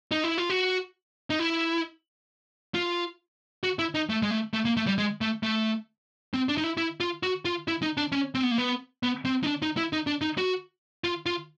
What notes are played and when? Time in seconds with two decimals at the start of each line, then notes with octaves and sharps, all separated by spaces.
0.12 D#4
0.24 E4
0.38 F4
0.50 F#4
1.30 D#4
1.39 E4
2.74 F4
3.64 F#4
3.79 E4
3.95 D#4
4.09 A3
4.23 G#3
4.31 A3
4.54 A3
4.65 A#3
4.77 A3
4.87 G3
4.98 G#3
5.21 A3
5.43 A3
6.34 C4
6.49 D4
6.58 D#4
6.64 E4
6.77 E4
7.00 F4
7.23 F#4
7.45 F4
7.68 E4
7.82 D#4
7.97 D4
8.12 C#4
8.35 C4
8.43 B3
8.51 A#3
8.58 B3
9.03 B3
9.25 C4
9.43 D#4
9.47 D4
9.62 D#4
9.77 E4
9.93 D#4
10.07 D4
10.21 D#4
10.38 F#4
11.04 F4
11.26 F4